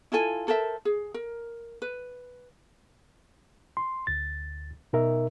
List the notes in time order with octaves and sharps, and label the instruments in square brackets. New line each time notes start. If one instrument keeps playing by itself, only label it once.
[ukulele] E4 F4 A4 G#5
A4 A#4 C5 E5
G#4
A#4
B4
[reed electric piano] C6
D2 A6
B2 D#4 A#4 E5